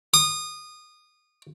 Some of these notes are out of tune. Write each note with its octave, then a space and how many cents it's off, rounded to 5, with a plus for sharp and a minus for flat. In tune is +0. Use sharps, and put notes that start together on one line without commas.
D#6 -25